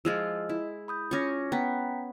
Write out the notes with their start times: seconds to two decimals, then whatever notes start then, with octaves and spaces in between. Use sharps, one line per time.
0.05 F3 G#3 F4 D#5 E6
0.49 E4
0.88 B5 D#6 G6
1.11 C#4 F4 C#6 D6 A#6
1.52 B3 G5 A#5 B6